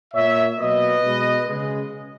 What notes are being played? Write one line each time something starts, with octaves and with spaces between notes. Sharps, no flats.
A#2 A#3 C#5 E5
B2 F#3 A#3 B4 D#5
B2 G#3
C#3 G#3